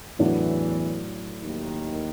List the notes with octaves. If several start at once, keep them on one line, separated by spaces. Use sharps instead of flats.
E2 A2 E3 F#3 B3 D4
D#2 D#3